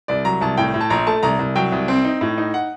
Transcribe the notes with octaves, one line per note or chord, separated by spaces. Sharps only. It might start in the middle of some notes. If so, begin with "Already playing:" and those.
C2 D5
F#3 A#5
C2 A5
A2 G5
A2
A5
A#1 A#5
A3 A5
C2 A#5
C2
F#3 G5
C2
C4
D#4
A2
D#4
F#5